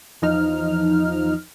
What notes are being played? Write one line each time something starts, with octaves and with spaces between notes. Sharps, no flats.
E2 F3 D#4 F6